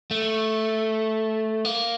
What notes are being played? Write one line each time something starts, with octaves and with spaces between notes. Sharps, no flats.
A3
A#3